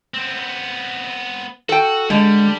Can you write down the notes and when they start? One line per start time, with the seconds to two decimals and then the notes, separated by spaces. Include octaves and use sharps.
0.14 B3 C4
1.69 F#4 A4 G5
2.10 D3 G3 G#3